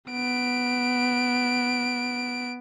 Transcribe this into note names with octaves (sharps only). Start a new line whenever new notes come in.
B3 D7